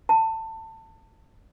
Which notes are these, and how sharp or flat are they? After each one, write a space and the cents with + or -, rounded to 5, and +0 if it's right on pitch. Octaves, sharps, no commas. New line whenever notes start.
F5 -20 A5 +25